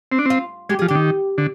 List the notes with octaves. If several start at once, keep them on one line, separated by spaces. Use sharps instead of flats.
C4
D4
C4 F4
G#3 G4
F3 G#4
D3 G4
D#3
D3